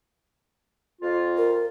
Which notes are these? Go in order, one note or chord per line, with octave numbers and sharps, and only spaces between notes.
F2 F4
A#4